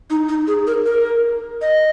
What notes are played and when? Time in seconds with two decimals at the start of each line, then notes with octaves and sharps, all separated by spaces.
0.10 D#4
0.29 D#4
0.47 G#4
0.67 A#4
0.86 A#4
1.61 D#5